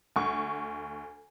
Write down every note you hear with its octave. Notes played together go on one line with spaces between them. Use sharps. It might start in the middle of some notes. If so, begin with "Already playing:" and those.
D2 C#6